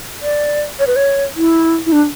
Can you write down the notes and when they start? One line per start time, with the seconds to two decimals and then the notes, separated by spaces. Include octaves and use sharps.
0.22 D5
0.79 C#5
0.87 B4
0.96 C#5
1.36 E4
1.86 E4
1.92 D4